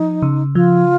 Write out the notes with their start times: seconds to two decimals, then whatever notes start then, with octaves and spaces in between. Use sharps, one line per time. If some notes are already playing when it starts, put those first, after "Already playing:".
Already playing: F3 D#4
0.22 C#3
0.55 F3 F4